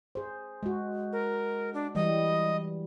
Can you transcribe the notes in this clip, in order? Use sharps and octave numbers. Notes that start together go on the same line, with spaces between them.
G#4 C5
G#3 F#4
A#4
D4
E3 G3 D#5